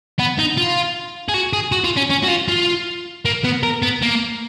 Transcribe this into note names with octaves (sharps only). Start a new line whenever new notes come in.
B3
D#4
F4
G#4
F#4
G#4
F#4
F4
C#4
C#4
F#4
F4
F4
A#3
B3
A#4
B3
A#3